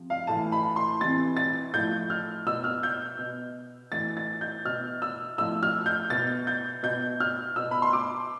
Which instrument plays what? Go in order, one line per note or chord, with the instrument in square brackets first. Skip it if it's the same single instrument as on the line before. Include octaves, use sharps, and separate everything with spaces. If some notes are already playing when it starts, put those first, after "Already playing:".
Already playing: [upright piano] C3 F3
F5
A2 E3 A5
B5
C6
C3 E3 A6
A6
A2 F3 G6
F6
B2 E6
F6
G6
B2
A2 E3 A6
A6
G6
B2 F6
E6
A2 F3 E6
F6
G6
B2 A6
G6
B2 G6
F6
B2 E6
B5
C6
D6